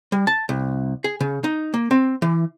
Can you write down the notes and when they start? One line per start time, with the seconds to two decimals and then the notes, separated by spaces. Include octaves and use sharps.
0.12 G3
0.27 A5
0.49 C2
1.04 G#4
1.20 C#3
1.44 D#4
1.74 A#3
1.91 C4
2.22 E3